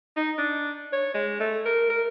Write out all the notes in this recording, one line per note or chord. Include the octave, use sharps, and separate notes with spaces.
D#4
D4
C#5
G#3
A3
A#4
A#4